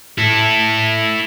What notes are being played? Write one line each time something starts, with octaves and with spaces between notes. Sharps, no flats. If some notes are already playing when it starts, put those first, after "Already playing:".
E4 A4